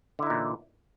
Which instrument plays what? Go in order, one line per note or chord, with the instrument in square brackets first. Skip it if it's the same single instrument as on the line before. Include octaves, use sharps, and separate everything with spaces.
[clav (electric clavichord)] D3
E4
D#4
A#2
E3